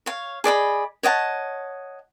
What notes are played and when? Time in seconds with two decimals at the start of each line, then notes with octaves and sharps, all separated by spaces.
0.06 C#5 F5
0.44 G#4 D5 D#5 B5
1.03 C#5 D#5 F#5 A5